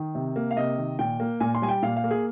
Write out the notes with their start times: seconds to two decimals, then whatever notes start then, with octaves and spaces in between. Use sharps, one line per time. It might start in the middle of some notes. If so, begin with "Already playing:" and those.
Already playing: D#3
0.15 C3
0.36 A#3
0.51 F5
0.56 C3 D#5
0.78 D#3
0.99 A#2 G5
1.20 A#3
1.40 A#2 G#5
1.55 C6
1.62 G3 G#5
1.69 G5
1.83 A#2 F5
1.96 F5
2.04 A#3
2.11 G#4